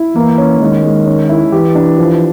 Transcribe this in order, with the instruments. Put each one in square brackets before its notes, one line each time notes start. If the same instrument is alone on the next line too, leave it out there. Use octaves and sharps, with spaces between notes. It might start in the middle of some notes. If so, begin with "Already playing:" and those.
Already playing: [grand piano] E4
[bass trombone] E3 [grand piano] A#3
[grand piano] C#4
[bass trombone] D#3 [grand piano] G#3
[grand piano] G#3
C#4
E4
[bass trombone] E3 [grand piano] G4
[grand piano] D4
F3